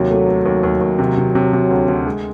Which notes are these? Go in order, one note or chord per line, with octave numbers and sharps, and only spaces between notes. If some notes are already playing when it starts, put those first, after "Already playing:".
Already playing: D#2 C3 F#3
A3
A3
D#2
D#2
D#2
C3
C3
C3
C3
D2
D2
G#3